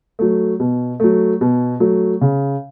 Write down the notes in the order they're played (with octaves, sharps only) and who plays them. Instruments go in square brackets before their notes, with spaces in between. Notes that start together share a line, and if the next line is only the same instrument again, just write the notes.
[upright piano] F#3 A3
B2
F#3 A3
B2
F#3 A3
C#3